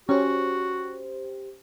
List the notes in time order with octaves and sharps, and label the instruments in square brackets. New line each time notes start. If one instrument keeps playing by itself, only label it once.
[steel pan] C#4 [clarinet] F#4 [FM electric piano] G4 C5